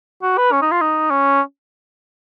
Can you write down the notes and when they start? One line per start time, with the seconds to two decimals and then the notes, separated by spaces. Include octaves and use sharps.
0.22 F#4
0.37 B4
0.52 C#4
0.62 D#4
0.71 F4
0.81 D#4
1.10 C#4